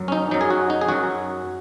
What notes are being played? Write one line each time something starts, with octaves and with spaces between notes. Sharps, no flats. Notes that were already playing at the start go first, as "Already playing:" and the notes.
Already playing: F#2 F#3
C#4
D#4
F#2 F#3 D#4
G#4
F#4
D#4
G#4
F#2 F#3 F#4